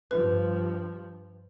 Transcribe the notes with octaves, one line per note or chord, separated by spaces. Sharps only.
G2 F3 B4